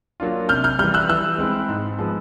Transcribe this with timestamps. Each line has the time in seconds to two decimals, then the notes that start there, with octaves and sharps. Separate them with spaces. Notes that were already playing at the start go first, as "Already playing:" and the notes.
0.20 F#3 A#3 D4 F4
0.49 C3 F6 G6
0.64 F6 G6
0.79 E3 G3 F6 G6
0.94 E6 F#6
1.09 E3 E6 F#6
1.38 G#3 C4 E4
1.69 G#2
1.98 F3 G#3 B3